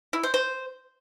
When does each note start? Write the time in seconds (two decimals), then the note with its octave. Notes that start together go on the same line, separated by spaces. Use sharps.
0.13 E4
0.23 C5
0.34 C5